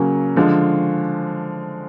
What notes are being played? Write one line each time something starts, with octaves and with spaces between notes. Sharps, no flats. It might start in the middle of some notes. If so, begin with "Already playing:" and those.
Already playing: C#3 F#3 A#3 C#4
D3 F3 G#3